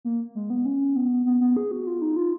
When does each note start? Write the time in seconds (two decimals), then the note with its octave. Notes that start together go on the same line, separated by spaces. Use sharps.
0.05 A#3
0.35 G#3
0.50 B3
0.65 C#4
0.96 B3
1.26 B3
1.41 B3
1.57 G#4
1.71 F#4
1.87 F4
2.02 D#4
2.16 F4